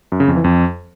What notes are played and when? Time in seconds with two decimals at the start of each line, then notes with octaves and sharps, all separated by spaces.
0.12 F#2
0.20 C#3
0.28 F2
0.36 E3
0.44 F2